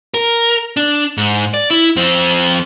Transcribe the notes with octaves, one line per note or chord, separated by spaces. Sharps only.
A#4
D4
G#2
D5
E4
F2 C4